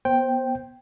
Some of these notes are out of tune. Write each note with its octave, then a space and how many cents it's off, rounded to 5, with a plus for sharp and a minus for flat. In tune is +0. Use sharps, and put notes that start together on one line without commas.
B3 -15 C5 +15 G5 +0